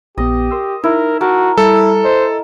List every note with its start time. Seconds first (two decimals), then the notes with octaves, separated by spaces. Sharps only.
0.18 A#1 B3 G4 D#5
0.51 A#4 C6 E6
0.84 D#4 E4 A#4
1.21 F#4 A#4 A5
1.58 G3 E4 A4
2.04 C5 D#5